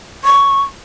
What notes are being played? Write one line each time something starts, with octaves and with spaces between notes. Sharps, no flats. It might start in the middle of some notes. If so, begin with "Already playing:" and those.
C#6